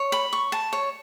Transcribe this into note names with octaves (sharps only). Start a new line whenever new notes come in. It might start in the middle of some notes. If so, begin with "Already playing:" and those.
Already playing: C#5
B5
C#6
A5
C#5